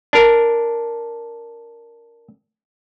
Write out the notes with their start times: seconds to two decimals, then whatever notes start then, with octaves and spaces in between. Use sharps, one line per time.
0.13 D4 A#4